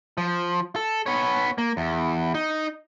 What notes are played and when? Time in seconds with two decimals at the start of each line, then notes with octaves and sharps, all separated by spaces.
0.18 F3
0.76 A4
1.06 B3 C#5
1.58 A#3
1.77 E2
2.34 D#4